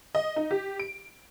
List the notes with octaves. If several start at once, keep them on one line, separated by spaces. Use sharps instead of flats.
D#5
D#4
G4
D7